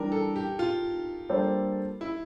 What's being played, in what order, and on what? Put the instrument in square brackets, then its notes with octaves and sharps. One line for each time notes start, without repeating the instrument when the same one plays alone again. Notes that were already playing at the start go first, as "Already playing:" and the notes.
Already playing: [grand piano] E3 G3 D4 [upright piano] A#4
[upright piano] A4
G4
F4
[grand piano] G3 A#3 D4 A4 C5
[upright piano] E4